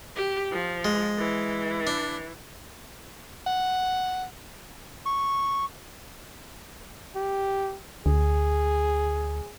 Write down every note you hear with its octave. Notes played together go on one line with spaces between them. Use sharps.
G4
F3
G#3
E3
D4
F#5
C#6
G4
D2 G#4